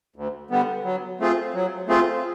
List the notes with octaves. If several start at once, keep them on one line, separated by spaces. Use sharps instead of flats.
D2
D3 G3 B3
F#3
A3 C4 F4 G#4
F#3
A3 C4 F4 G#4